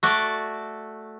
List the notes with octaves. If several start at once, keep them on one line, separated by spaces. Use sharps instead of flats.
A3 F#4 D5